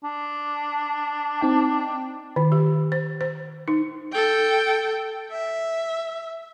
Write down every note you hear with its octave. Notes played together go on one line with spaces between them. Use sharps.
D4
C4 D#4 G5
D#3
G4
C5
C5
D#4
A4 G5
E5